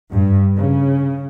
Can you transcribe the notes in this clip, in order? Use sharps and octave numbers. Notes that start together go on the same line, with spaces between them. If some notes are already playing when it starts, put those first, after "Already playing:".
G2
C#3